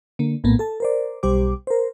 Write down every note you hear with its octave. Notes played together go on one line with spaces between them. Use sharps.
D3 A#3
A#1 A2 A#3 B3
A4 A5
A#4 C5 D5
B1 G3 G4 C5 D6
A#4 C5